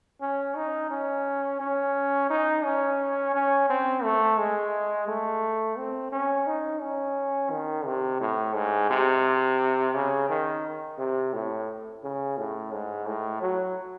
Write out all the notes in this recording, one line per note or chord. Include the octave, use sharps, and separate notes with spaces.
C#4
D#4
C#4
C#4
D#4
C#4
C#4
C4
A3
G#3
A3
C4
C#4
D#4
C#4
D#3
C3
A2
G#2
C3
C#3
D#3
C3
A2
C#3
A2
G#2
A2
F#3